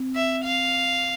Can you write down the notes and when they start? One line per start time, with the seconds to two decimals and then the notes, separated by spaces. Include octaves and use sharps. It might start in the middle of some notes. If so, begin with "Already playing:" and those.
Already playing: C4
0.15 E5
0.44 F5